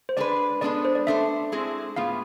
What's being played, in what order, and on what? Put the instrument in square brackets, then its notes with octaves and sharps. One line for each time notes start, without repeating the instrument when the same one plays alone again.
[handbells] C5
[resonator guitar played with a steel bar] G#3 D4 G#4 B4 [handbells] D5
[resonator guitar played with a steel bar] G#3 B3 D4 A4 [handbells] D5
[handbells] C5
D5
[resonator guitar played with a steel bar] A3 D4 A4 C5 [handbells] E5
[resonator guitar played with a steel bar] G#3 C4 E4 G#4
[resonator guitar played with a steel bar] A2 G#3 B3 F4 G#4 [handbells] F5